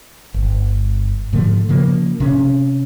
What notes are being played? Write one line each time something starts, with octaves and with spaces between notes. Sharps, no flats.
G1
G#2 D3 F3 A3
C#3 F3 A#3
C3 C#4